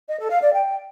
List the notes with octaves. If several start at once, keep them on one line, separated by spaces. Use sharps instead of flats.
D#5
A4
F5
D5
G5